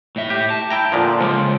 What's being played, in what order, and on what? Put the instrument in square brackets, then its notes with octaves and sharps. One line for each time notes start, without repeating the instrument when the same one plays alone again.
[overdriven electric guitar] A2 E5
[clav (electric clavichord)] G4
[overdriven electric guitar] A5
[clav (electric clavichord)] E4 G5 A#5
A#2 D3 F3
[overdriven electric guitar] C#3 G#3 [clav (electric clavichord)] F3